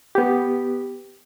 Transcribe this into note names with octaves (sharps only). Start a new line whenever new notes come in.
B3 G4